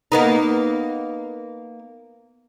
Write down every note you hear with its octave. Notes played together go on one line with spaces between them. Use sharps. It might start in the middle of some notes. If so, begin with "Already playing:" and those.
A#3 B3 D#4